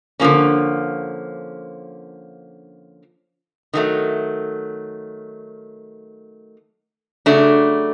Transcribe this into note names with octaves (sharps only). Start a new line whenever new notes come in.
D3 F3 A#3 C#4
D#3 F#3 A3
C#3 F#3 A3 D4